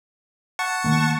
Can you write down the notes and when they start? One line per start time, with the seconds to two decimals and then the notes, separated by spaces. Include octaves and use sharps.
0.59 F#5 A5 C#6
0.84 D#3 A3 A#3